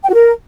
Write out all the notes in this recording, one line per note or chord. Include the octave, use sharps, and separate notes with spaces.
G5
F#4
A#4